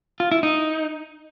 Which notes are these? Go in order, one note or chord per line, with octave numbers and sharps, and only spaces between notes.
F4
E4
D#4